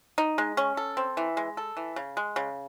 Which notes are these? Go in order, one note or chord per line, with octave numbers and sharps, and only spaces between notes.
D#4
G#3
C#4
A4
C4
E3
G#3
A4
E3
C#3
G#3
C#3